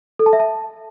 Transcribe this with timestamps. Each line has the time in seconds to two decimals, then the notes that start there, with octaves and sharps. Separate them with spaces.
0.19 A4
0.26 A5
0.33 E5
0.40 A5